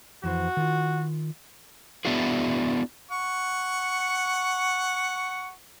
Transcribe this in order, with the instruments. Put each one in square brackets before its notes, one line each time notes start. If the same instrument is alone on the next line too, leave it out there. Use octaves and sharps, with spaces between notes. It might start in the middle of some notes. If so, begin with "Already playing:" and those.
[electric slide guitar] F2 E3 C5 [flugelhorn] F#4
[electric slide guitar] D#3 F4
B3 D4 E4 F#4 G#4
[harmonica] F#5 C#6